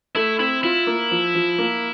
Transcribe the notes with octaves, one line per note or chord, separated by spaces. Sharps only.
A3 E4
C4 E4
E4 F4
A#3
F3
F3
A#3